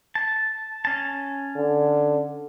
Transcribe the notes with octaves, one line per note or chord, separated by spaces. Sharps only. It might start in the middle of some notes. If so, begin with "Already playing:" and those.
A5
C#4 A5
D3